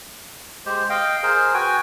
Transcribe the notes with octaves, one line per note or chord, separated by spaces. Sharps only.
G#3 G4 C5
D#5 F5 G5
G#4 A#4 C5
F#4 B4 G5 G#5